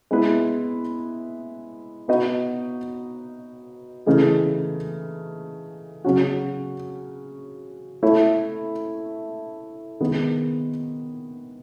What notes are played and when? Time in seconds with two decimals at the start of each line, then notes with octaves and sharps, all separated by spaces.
0.11 G#3 B3 E4 B4
2.08 B3 D#4 F#4 B4 D#5
4.06 C#3 E3 A3 D#4 G#4
6.04 C#3 F#3 C#4 F#4
8.03 A3 E4 A4 C#5 E5
10.01 D#3 G#3 B3